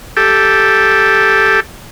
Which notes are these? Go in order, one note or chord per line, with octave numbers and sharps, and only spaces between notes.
G4 A4